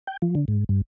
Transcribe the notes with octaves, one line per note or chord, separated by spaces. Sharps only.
G5
F3
D3
G#2
G2